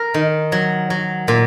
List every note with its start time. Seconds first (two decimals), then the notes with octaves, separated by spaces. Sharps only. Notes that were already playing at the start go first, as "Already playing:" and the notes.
Already playing: A#4
0.14 D#3
0.52 F#3
0.90 F#3
1.28 A#2